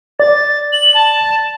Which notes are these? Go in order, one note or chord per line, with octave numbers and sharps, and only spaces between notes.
D5 A6
F#7
A5